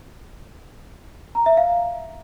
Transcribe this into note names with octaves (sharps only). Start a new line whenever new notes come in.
A#5
E5
F5